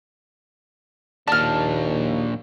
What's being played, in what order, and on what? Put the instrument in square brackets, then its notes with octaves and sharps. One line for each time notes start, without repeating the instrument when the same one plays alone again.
[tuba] D#2 [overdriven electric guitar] A#2 D4 [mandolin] A5 F6